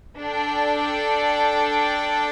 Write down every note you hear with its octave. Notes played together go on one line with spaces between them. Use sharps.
D4 A4 D5 G5